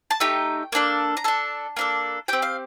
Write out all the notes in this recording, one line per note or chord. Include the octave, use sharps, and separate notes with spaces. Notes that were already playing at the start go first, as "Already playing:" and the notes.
A5
A3 D#4 G4 G5
A#3 D4 A4
A#5
D4 A4 A5
A#3 D4 A4
C4 G4 G5
F5